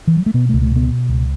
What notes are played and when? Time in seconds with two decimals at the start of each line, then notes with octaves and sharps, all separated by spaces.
0.07 E3
0.16 F#3
0.26 A3
0.34 B2 B3
0.49 C#2 A3
0.62 A3
0.71 B2 B3
0.90 B2
1.09 C#2